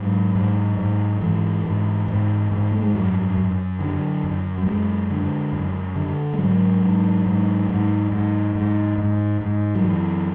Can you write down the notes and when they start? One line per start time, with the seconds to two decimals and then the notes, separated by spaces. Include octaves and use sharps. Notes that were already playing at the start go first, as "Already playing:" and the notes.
Already playing: G#2 F#3
0.35 G#2
0.78 G#2
1.21 G#2 E3
1.65 G#2
2.08 G#2
2.52 G#2
2.71 A3
2.82 G#3
2.94 F#2 F#3
3.37 F#2
3.80 D3
4.24 F#2
4.58 F#3
4.66 F#2 G#3
5.10 D3
5.52 F#2
5.96 D3
6.33 G#3
6.39 G#2 F#3
6.83 G#2
7.26 G#2
7.69 G#2
8.12 G#2
8.55 G#2
8.98 G#2
9.41 G#2
9.75 F#3
9.84 F#2 E3